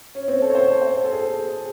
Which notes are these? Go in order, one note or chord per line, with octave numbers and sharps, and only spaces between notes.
C#4
C4
A4
C#5
C5
C#5
C5
C5
A4
G#4
A4
G#4